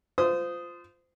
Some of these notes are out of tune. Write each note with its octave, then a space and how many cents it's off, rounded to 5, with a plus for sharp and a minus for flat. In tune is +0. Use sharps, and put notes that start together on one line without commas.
F4 +0 C5 -25 D#6 +0